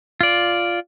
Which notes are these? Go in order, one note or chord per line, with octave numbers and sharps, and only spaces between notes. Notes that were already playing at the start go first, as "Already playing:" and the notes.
F4 D5